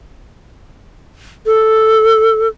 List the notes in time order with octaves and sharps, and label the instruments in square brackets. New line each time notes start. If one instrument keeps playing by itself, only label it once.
[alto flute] A4